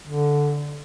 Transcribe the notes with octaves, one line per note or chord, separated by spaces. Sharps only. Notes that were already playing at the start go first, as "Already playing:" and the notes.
D3